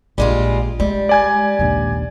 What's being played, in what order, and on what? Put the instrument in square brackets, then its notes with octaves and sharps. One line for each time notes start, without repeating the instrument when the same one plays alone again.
[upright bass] A#1 [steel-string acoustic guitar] G3 G#3 F4
[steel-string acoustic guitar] G3 [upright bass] G#3
[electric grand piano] D5 G#5 G#6
[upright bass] A#1 D#2